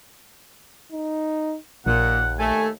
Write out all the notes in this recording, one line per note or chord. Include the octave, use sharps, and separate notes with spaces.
D#4
A#1 D#2 A#2 F#5
A3 G#5